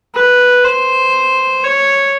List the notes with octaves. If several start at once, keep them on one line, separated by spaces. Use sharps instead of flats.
B4
C5
C#5